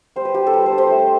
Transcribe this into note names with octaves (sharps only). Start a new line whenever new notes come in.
G3 C5
B4
D4 G4
A4
G3 B4
C5
D4
C5
A3